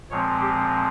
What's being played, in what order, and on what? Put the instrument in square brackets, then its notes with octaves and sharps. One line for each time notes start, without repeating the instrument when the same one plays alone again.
[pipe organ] A#2 F3 G#3 C4 C#5
G4